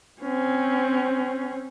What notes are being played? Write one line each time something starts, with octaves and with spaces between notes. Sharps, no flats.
C4 C#4